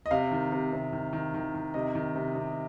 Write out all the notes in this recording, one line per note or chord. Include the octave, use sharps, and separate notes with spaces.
D#5
C3 F5
D#3
C3
C3
D#3
D#3
D#3
D#3
C3 D#5
D#3
C3
C3